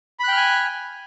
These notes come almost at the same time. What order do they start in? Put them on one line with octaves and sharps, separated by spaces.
B5 F#6 G5 F6 G#5